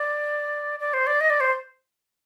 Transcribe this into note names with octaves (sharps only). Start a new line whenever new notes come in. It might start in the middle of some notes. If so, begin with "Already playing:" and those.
Already playing: D5
D5
C5
D5
D#5
D5
C5